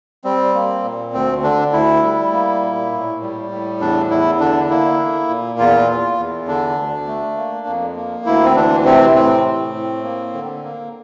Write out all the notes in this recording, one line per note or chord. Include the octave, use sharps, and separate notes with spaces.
G3 C4
A#3
A#2
D2 C4
D3 D4
D2 E4
G3
A#3
A#2
A2
G3
A2
E2 D4
E2 E4
D3 D4
A#3 E4
A#3
A#2
E2 F4
E2
E2
D3 D4
D2
A3
A#3
F2
A#3
D2 E4
C4
E3 D4
C3 C4
A2 C4
A2
A2
A#3
D3
A#3